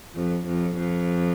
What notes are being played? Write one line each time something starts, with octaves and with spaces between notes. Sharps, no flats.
F2
F2
F2